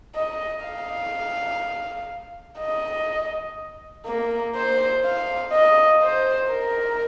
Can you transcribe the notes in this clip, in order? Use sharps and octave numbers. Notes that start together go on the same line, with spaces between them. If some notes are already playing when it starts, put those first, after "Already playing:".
D#5
F5
D#5
A#3
C5
F5
D#5
C5
A#4